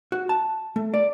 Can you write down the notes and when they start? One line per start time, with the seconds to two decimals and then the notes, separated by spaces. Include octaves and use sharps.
0.12 F#4
0.29 A5
0.76 A3
0.94 D5